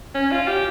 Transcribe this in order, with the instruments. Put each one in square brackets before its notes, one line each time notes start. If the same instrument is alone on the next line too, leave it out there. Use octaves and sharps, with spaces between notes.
[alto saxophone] C#4
F4
G4